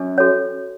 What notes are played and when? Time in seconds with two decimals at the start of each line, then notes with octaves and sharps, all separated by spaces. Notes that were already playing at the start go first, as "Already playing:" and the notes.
Already playing: F#2
0.18 F#4 A4 C#5